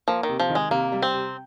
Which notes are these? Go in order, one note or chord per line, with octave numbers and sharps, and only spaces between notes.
F3 A#3
D#3
C3
F3
D#3
G#3
C3 A#3
G3
C4
C3